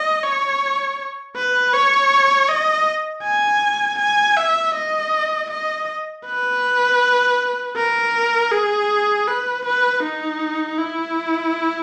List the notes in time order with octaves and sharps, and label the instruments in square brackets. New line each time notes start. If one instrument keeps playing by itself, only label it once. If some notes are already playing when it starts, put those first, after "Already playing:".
Already playing: [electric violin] D#5
C#5
B4
C#5
D#5
G#5
G#5
E5
D#5
D#5
B4
A#4
G#4
B4
B4
D#4
E4